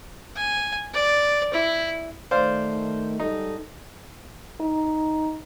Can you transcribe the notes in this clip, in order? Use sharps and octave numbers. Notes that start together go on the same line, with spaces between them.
G#5
D5
E4
D#3 A3 C5 D5 F5
G#2 G3 D#4 A4
D#4